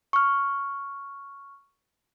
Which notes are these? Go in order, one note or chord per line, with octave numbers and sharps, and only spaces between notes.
C#6 F6